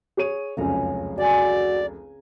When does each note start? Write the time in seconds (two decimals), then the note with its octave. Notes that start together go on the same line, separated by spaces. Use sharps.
0.17 G#4 C#5 D#7
0.57 F1 C#2 F#2 C#3 A#5
1.18 F#4 D5 G#5